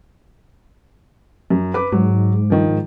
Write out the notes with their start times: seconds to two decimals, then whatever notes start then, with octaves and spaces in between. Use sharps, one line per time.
1.50 F#2
1.74 B4 D6
1.92 G#2 F#3
2.50 G2 D#3 F3
2.70 G#2